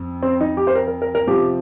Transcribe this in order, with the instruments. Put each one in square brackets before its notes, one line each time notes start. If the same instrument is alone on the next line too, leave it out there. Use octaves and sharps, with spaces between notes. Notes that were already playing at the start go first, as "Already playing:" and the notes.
Already playing: [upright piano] F2
[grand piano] C4
D#4
G4
C5
A#4
A#4
A#4
A#4
[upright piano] C3 F3 C4 [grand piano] G4